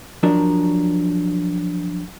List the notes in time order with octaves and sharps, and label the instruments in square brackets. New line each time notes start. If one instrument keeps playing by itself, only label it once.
[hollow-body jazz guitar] F3 F#3 D4 A#4